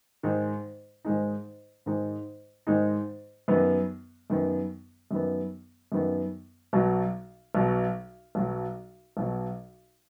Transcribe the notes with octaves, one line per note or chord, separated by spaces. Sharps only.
G#2 D#3 G#3 D#4
G#2 D#3 G#3 D#4
G#2 D#3 G#3 D#4
G#2 D#3 G#3 D#4
F#2 D#3 B3
F#2 D#3 B3
F#2 D#3 B3
F#2 D#3 B3
B1 B2 F#3
B1 B2 F#3
B1 B2 F#3
B1 B2 F#3